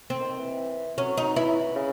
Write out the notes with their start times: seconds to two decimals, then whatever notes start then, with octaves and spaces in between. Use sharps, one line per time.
0.10 C4
0.20 D#3
0.39 E3
0.98 F#3 C#4
1.17 D#4
1.36 E3 E4
1.75 C#3